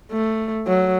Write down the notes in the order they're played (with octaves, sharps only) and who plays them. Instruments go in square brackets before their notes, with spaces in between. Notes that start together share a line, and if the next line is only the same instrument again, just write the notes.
[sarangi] A3
F#3